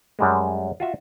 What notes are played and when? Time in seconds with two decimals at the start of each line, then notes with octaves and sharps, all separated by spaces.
0.19 F#2 G3 G#3
0.80 F4 F#4 E5